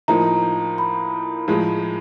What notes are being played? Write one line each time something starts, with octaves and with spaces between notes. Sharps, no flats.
A2 F3 A#3 D#4 A#5
B5
A2 F3 G#3